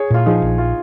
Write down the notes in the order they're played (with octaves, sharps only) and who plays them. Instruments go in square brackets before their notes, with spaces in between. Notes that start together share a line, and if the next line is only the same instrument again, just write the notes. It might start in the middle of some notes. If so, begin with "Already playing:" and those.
Already playing: [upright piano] G#4 C#5
[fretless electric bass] A#2 [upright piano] F4
[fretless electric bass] F3 [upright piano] D#4 G#4
[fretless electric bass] A#1
[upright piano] F4